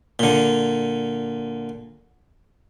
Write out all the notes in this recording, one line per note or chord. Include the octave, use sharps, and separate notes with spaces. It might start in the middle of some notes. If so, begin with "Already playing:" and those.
A#2 D3